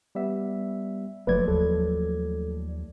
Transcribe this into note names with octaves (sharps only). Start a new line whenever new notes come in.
G3 B3 E5
F#1 F3 F#3 A3 A#3 B4 D5 G#6
D#2 A4